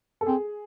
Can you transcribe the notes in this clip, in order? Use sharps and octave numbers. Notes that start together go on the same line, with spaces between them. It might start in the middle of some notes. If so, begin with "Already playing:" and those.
A4
C4 G#4